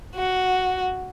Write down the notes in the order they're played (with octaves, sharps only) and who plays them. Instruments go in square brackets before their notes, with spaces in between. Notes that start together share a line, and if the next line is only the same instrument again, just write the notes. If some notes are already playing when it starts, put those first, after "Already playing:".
[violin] F#4